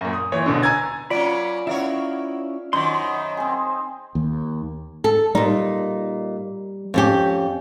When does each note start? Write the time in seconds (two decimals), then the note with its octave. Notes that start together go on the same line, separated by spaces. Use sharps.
0.01 F#2 A#2
0.13 D#6
0.32 A#2 E3 C#5
0.46 E1 A#1 B2 D3
0.62 G#5 A#5 E6 G#6 A6
1.10 F#3 A#3 C#4 F4 D5 B5 D7
1.67 B3 C#4 E4 A#4 C#5 F5
2.73 F#2 D#3 D#4 C5 D#5 B5 C6
3.37 C4 G#4
4.15 D#2
5.04 A4
5.35 A#2 G3 D#4
6.94 F2 C#4 G4